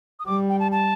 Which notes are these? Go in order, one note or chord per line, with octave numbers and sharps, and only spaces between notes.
D#6
G3 D6
G5
A5
A5